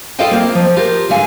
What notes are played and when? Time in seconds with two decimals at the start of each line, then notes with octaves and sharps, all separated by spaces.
0.19 F4 A4 D5 D#5 F5 G5
0.31 A#3 C4 F4
0.55 F3
0.77 F4 G4 A#4
1.09 G#2 D3 F5 G#5